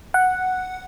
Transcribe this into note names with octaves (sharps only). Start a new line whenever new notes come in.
F#5